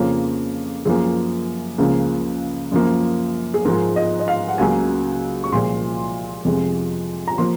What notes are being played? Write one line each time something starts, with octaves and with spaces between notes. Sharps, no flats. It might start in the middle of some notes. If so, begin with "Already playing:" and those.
Already playing: F2 C#3 F3 A#3 C#5
F#2 F3 A#3 G#4
C#2 C#3 F3 A#3
F#2 F3 A#3
G#4
G#2 F3 G#3 A#4
D#5
D#5
F5
F#5
C#2 C#3 F#3 A#3 G#5
C#6
C2 A#2 F3 G#3 C6
F2 C3 F3 G#3
A#5
F3 A#3 C6